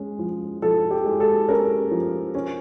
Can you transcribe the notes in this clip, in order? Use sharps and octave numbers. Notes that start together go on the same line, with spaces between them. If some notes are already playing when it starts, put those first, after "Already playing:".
Already playing: G#3 C#4
F3
F3 A4
G4
G#3
A4
C#4 A#4
F3
C#4